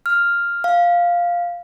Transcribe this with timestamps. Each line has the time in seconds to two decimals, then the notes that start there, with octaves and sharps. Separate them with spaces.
0.06 F6
0.64 F5